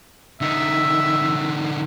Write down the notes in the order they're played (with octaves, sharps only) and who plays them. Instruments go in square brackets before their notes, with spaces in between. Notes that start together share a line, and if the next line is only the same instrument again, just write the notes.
[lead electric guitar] D3 D#4 [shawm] E5